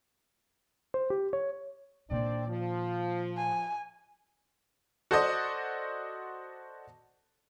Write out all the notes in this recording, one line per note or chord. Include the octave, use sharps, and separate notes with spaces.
C5
G4
C#5
A#2 D#3 C4 D4 D5
F3
G#5
F#4 A4 C5 D5 D#5